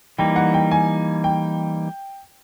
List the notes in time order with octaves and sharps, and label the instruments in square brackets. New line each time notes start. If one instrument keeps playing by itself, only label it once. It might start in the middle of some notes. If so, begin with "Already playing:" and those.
[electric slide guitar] E3 G3 A#3 D#4 [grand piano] G5
[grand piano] F#5
G5
G#5
G5